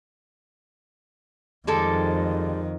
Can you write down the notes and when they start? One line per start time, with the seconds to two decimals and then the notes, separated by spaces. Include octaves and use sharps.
1.67 F2 D#3 G3 G#3 A4